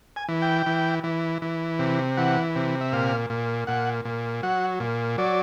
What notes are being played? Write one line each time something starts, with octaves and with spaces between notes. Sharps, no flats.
G#5
E3
G5
E3
E3
E3
C3
E3 F#5
C3
E5
A#2 F5
A#2
A#2 F#5
A#2
F#3 F#5
A#2
F#3 D5